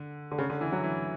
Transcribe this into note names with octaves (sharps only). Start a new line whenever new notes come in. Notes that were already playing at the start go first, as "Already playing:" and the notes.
Already playing: D3
D3
C#3
D3
E3
F#3
E3